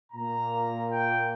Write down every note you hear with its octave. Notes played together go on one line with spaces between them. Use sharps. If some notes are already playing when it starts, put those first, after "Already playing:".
A#2 A#3 A#5
G5